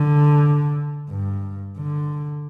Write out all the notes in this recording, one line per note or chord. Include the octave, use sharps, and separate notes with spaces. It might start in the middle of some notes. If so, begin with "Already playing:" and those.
Already playing: D3
G2
D3